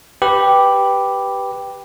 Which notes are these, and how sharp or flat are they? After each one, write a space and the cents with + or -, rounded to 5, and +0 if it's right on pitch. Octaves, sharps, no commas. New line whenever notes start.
G4 +0 B4 +0